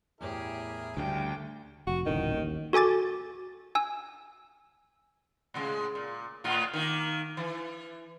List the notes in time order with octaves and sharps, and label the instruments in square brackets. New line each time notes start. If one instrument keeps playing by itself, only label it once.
[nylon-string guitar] E2 A2 C#5 [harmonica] E4 G#4 A#4 [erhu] G4
[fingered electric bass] D2 [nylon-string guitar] C#3 G3 [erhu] G5
[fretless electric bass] F1 [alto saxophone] F#4
[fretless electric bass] D#1 A1 D2 [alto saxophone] D#3
[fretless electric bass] D#2
[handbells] F#4 A4 G#5 D6 A6
G#5 E6
[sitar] A2 C#3 G#3
A#2
A2 F4
D#3 A#3
E3